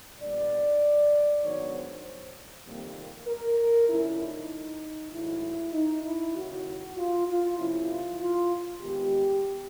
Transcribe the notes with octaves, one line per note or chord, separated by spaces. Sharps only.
A#2 G3 B3 D4 D5
G#2 D#3 F#3 B3 D4 C#5
C5
F2 C3 D#3 G3 A#3
A#4
F#2 C#3 F3 A3 D4 E4
D#4
G#2 D#3 F#3 A3 E4
D#4
E4
D#2 C#3 F#3 F#4
F4
F4
C3 F3 A#3 C#4 E4
F4
F4
D#2 D#3 G#3 B3 G4